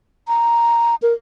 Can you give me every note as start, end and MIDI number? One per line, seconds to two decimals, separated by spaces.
0.28 0.95 82
1.02 1.13 70